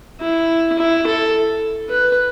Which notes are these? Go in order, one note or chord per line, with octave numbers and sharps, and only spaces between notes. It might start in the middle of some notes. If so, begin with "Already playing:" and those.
E4
E4
A4
B4